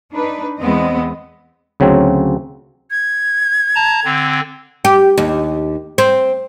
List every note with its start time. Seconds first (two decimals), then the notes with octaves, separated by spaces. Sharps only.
0.13 D4 D#4 B4
0.60 E2 G#3 B3 C4 D#5
1.80 D2 C#3 F#3 C4
2.91 G#6
3.75 A5 A#5
4.05 D3 C4
4.85 G4
5.18 D#2
5.98 C4